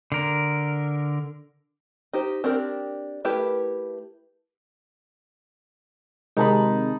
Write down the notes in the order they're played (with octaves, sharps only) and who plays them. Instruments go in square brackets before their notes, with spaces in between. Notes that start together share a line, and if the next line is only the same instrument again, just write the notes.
[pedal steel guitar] D3 A#4
[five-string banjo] D#4 G4 C5
C4 D4 G4 A#4
A3 E4 G4 A#4 B4
[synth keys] C3 D#3 G#3 [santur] D#4 A5 B5